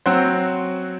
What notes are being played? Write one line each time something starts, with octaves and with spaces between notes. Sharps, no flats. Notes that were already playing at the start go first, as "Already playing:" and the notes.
F#3 C4 F#4 C5